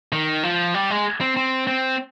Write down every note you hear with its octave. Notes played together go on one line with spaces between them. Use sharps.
D#3
F3
G3
G#3
C4
C4
C4